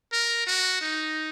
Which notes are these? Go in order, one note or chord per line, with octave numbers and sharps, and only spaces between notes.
A#4
F#4
D#4